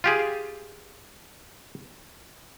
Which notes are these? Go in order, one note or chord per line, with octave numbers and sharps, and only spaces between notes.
F4 G4 G#4